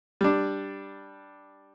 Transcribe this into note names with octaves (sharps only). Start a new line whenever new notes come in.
G3 D4